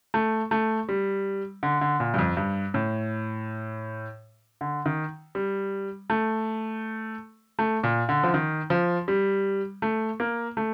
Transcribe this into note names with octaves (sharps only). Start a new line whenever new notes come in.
A3
A3
G3
D3
D3
A#2
G2
F2
G2
A2
D3
D#3
G3
A3
A3
A#2
D3
F3
D#3
F3
G3
A3
A#3
A3